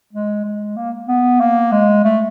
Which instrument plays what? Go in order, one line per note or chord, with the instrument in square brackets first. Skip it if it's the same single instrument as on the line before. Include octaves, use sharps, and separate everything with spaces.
[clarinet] G#3
G#3
A#3
B3
A#3
G#3
A3